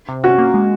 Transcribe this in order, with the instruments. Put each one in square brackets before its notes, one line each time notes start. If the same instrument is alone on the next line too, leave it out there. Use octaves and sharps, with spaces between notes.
[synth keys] C3
[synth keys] C#4 [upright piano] F#4
[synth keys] A#3
G#3